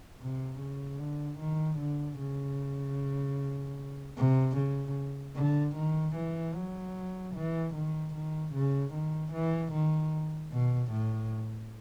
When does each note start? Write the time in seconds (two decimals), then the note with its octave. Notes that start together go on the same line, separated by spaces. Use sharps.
0.20 C3
0.60 C#3
0.99 D3
1.39 D#3
1.79 D3
2.19 C#3
4.17 C3
4.57 C#3
5.36 D3
5.76 D#3
6.16 E3
6.55 F#3
7.35 E3
7.75 D#3
8.15 D#3
8.54 C#3
8.93 D#3
9.33 E3
9.73 D#3
10.52 B2
10.92 A2